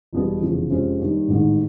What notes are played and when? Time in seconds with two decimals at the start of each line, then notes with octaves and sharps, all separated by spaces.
0.13 E1 E2 B2 G3 B3
0.41 F1 E2 C#3 F3
0.70 F2 C3 F3 G#3 C#4
0.99 D#2 D#3 G3
1.28 A1 G#2 D#3